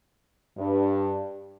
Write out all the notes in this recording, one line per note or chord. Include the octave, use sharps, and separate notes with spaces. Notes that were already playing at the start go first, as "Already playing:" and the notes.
G2